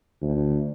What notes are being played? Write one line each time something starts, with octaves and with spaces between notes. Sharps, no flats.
D2